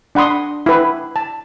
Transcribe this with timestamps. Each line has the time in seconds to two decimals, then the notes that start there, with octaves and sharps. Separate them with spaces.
0.15 D4 F#5 B5 C6 D#6
0.66 E4 B4
1.16 A5